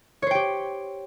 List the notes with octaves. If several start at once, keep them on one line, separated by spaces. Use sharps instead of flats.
G4 C5 C#5 G5